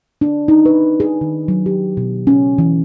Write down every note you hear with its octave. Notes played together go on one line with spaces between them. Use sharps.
D4
D#4
B4
G#4
D#3
F#3
G4
B2
C#4
E3